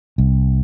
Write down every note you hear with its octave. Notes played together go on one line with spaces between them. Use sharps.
C2